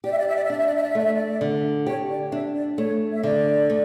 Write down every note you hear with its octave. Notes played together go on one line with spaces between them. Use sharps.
G4 D5
E5
D5
E5
D5
E5
D4 D5
E5
D5
E5
D5
E5
A3 D5
E5
D5
D3
G4 C#5
D5
D4 E5
D5
A3 C#5
E5
D3 D5
A3